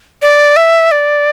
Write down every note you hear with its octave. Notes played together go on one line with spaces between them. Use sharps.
D5
E5
D5